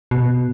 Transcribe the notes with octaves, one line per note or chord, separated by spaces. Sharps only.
B2